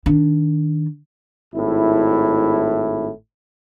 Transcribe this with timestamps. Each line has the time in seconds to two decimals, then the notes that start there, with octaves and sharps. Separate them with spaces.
0.06 D#3 D4
1.54 G#1 A2 E4